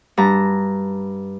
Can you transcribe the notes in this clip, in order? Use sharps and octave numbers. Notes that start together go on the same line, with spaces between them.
G2 A5 A#5